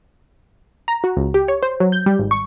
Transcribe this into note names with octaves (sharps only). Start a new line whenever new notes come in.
A#5
F#4
C#2
G4
C#5
C5
F#3
G6
G3
G#1
C#6